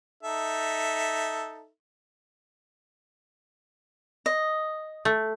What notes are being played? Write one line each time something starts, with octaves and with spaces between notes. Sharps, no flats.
D#4 A4 E5
D#5
A3